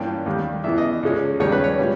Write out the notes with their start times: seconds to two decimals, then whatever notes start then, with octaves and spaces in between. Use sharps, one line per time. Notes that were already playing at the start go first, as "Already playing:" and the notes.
Already playing: G2 E3 A#3 C#4 G5
0.26 D#2 D#3 G3
0.64 E2 C#3 E3 E5
0.78 D#5
1.03 C#2 C#3 G#3 C#4
1.40 D#2 C#3 G3 C#5
1.52 B4
1.64 C#5
1.78 A#2 G3 C#4